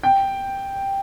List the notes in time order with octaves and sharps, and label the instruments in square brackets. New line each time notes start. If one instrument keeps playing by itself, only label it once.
[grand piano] G5